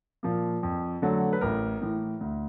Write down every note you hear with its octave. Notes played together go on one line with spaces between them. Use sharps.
A#2 F3 A#3
F2
D3 F#3 A3
B4
A1 A#4
A2 E3
D2